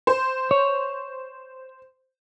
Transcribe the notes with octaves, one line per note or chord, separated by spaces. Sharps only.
C5
C#5